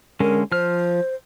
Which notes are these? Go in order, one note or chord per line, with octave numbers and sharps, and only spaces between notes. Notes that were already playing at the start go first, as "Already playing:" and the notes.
D3 G#3 C#4 A#4
F3 C5 F6